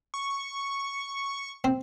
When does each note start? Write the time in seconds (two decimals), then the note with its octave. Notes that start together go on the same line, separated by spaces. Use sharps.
0.14 C#6
1.64 C4